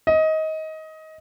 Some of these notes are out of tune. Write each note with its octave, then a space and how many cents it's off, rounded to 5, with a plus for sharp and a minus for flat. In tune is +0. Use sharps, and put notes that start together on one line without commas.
D#5 +20